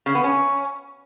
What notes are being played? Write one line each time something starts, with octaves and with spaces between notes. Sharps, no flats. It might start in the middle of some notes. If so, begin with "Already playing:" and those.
C#3
B3
C#4